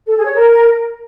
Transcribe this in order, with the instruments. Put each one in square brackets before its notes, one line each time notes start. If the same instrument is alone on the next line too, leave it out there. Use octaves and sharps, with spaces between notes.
[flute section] A4
G#4
C#5
A#4